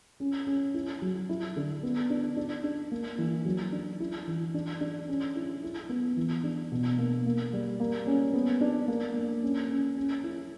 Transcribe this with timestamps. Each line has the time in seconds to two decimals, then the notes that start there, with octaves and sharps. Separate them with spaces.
0.20 C#4
0.47 C#4
0.74 E4
1.02 F#3
1.29 E4
1.56 D3
1.83 B3
2.10 D4
2.37 D4
2.64 D4
2.91 A#3
3.18 E3
3.45 F#3
3.72 D4
4.00 E4
4.27 E3
4.54 D4
4.81 D4
5.08 C#4
5.35 E4
5.63 E4
5.89 B3
6.17 E3
6.44 D4
6.72 B2
6.98 A#3
7.26 A#3
7.53 G3
7.80 A#3
8.07 C#4
8.34 B3
8.61 D4
8.88 A#3
9.15 A#3
9.43 C#4
9.69 C#4
9.97 C#4
10.23 E4